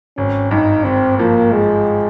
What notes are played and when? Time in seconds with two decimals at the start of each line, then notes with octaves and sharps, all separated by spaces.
0.17 G#1 C#4
0.51 G2 D#4
0.84 G#1 C4
1.18 F3 A#3
1.52 G2 G#3